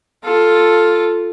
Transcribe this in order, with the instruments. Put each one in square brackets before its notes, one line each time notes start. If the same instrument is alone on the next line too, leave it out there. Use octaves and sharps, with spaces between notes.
[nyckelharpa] F4 A4